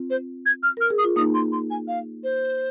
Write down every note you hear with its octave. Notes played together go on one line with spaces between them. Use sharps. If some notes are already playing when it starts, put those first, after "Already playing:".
Already playing: C4 F4
C5
G#6
F6
A#4 F6
G#4
D#6
F4
A#3 D#4 D#6
C6
C6
G#5
F5
C5